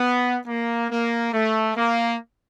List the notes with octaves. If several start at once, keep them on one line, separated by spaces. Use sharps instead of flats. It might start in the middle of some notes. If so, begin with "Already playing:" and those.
Already playing: B3
A#3
A#3
A3
A#3